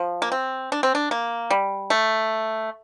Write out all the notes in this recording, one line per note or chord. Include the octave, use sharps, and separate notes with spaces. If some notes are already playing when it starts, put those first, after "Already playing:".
Already playing: F3
A#3
C4
D4
C4
D4
A#3
G3
A3